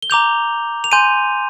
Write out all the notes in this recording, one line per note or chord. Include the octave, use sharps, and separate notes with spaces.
G7
A#5 D6 G6 F7
F7
G#5 C6 G6 D#7